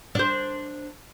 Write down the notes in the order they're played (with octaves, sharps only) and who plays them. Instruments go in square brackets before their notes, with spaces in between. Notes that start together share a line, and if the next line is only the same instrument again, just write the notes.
[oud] D4 C5